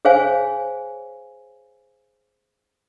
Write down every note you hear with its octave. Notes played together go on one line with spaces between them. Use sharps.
G#4 C5 C#5 F5 G#5